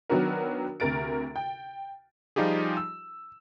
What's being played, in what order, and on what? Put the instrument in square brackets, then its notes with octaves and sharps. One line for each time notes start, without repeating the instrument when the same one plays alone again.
[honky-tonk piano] D#3 F#3 B3 D4 F#4 A#4
D2 C3 A#4 A6 D7
G5
[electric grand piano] F3 G3 D#4 F4 G4 G#4
E6